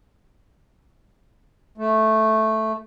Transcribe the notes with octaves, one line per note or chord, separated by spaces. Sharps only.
A3